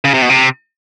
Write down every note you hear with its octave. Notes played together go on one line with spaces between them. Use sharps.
C#3
C3
B2
C3